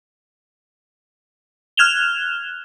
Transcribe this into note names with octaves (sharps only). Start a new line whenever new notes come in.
F6 F#6 G#6 E7 F7 G7